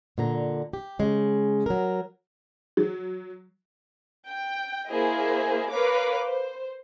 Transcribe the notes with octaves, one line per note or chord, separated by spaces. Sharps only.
A#2 D3 A#5
G4
C#3 G#3
F#3 A#4
F#3
G5
A#3 E4 G#4 C5 D#5
A#4 B4 C#5 F5 D6
C5